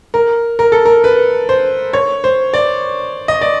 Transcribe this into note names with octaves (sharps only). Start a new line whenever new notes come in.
A#4
A#4
A4
A#4
B4
C5
C#5
C5
D5
D#5
D5